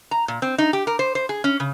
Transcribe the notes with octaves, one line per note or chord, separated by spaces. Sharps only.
A#5
A#2
C4
D#4
G4
A#4
C5
C5
G#4
C#4
C#3